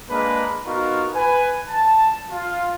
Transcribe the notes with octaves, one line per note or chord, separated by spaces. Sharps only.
G#3 A#3 D4 A#4 B4
B3 D#4 F4 F#4 A#4
B4 G#5
A5
F4